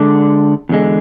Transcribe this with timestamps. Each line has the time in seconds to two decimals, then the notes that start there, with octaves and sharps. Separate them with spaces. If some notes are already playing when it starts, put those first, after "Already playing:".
Already playing: D3 G#3 D4 A4 D5
0.69 E2 D3 G#3